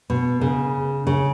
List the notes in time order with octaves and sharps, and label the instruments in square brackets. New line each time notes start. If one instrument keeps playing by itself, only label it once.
[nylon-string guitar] B2
C#3
C#3